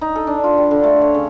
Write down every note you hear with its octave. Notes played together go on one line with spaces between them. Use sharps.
D#4
A4
D4
F4
G3
D3
A3
C#5
C#3